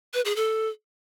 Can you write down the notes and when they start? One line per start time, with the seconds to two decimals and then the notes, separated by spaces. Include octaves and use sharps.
0.14 B4
0.25 G#4
0.36 A4